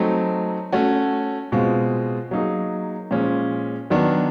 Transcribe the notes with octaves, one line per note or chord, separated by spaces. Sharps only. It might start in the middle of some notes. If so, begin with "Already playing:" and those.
Already playing: F#3 A3 C4 D#4
A3 C#4 F#4
B2 G#3 C4 F4
F#3 A#3 D#4 G#4
A#2 F3 G#3 C#4
D#3 F#3 B3 D4